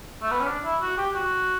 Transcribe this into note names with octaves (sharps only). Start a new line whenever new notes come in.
A3
B3
C#4
D4
E4
F#4
G4
F#4